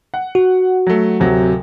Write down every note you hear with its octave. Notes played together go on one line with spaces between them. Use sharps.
F#5
F#4
F#3 A3
D1 C3 F#3